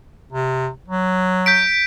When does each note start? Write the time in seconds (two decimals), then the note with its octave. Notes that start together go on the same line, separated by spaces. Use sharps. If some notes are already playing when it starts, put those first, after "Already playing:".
0.32 C3
0.88 F#3
1.46 G6 B6 D7